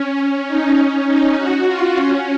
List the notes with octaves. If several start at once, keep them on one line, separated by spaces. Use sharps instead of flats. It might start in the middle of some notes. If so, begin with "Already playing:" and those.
Already playing: C#4
D#4
C#4
D#4
F#4
F4
C#4